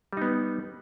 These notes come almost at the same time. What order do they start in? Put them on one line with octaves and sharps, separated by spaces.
G3 D#4 B3